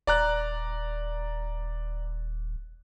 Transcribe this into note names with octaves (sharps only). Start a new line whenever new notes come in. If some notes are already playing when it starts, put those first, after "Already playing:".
D#1 D5 A#5 F#6